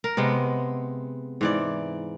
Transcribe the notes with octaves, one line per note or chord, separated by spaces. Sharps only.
A#4
C3 G#3 B3
G#2 E3 D5